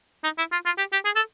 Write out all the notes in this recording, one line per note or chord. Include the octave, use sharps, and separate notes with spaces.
D#4
E4
F4
F4
G4
G4
G#4
A4